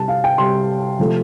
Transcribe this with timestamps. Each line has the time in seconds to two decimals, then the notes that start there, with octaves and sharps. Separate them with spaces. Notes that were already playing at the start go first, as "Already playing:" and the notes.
Already playing: C3 G3 A5
0.08 F5
0.24 G5
0.38 C3 G3 C6
0.99 C3 F3 A3